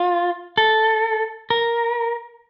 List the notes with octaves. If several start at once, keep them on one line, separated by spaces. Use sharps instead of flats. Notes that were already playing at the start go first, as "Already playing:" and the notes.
Already playing: F4
A4
A#4